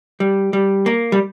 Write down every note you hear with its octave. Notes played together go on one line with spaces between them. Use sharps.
G3
G3
A#3
G3